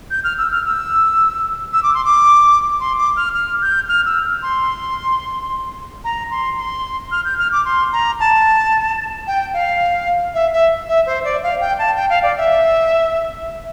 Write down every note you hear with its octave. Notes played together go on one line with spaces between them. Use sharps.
G6
F6
E6
F6
E6
E6
D6
C6
D6
C6
D6
F6
F6
G6
F6
E6
C6
A#5
C6
C6
F6
G6
F6
D6
C6
A#5
A5
G5
F5
E5
E5
E5
C5
D5
F5
G5
A5
G5
F5
D5
E5